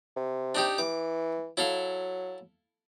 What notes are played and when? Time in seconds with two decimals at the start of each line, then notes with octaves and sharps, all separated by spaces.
0.16 C3
0.55 D4 D#4 G4
0.78 E3 D6
1.57 F#3 E4 A4 F5